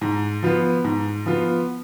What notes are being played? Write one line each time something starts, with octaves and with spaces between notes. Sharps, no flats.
G#2
F3 B3 F4
G#2
F3 B3 F4